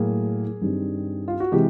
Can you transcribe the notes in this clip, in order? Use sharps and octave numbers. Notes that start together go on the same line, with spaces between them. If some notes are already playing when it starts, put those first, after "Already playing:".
Already playing: A2 F#3 A#3 G#4
G2 D#3 G3 C4
F4
F#4
C3 E3 G#3 G4